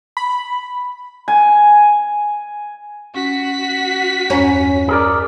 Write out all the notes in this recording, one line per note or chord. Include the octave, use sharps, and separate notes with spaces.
B5
G#5
C#4 F#4 B6
E2 G2 C#4 A#5
G#4 A#4 D5